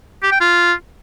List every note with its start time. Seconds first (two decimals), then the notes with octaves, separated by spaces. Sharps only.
0.23 G4
0.32 G5
0.41 F4